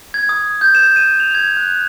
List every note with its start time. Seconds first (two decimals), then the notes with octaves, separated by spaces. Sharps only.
0.14 G#6
0.29 D#6
0.61 G6
0.75 E7
0.96 D#7
1.20 F7
1.35 G#6
1.57 F#6